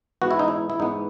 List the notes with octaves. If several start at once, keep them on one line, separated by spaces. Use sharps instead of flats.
G#2 E3 B3 F#4
E4
D#4
E4
E4
G#2 E3 B3 D#4